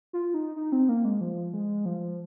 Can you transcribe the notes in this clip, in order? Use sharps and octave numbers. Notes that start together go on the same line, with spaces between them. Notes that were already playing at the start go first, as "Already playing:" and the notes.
F4
D#4
D#4
C4
A#3
G#3
F3
G#3
F3